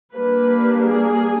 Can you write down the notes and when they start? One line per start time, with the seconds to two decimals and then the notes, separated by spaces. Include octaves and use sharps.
0.14 G3 A#3 D4 B4
0.85 G#4